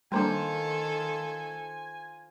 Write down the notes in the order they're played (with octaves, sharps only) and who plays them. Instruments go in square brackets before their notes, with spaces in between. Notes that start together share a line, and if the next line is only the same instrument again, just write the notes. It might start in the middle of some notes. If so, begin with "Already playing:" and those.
[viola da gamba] D#3 A4 [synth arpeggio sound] G3 A#3 D4 [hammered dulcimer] F4 C5 [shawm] G#5